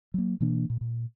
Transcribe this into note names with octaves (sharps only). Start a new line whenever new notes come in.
F#3 A#3
B2 E3 A#3 D4
A#2
A#2